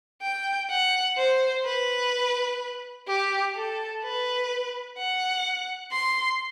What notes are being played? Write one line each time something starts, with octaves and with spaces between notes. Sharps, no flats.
G5
F#5
C5
B4
G4
A4
B4
F#5
C6